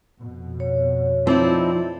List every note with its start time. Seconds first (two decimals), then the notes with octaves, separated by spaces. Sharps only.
0.19 F2 B2
0.60 C#5
1.27 F3 C4 D#4 E4 A4 D5